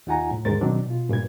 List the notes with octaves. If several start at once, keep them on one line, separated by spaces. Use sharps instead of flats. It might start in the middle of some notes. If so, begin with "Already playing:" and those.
D#2 D#4 F4 F#5 G#5 A#5
A2
D#2 G#2 D3 A#4 C5 A6
B2 D#3 F#3 C4 D4
B2 F4
G2 A#2 B4 G#6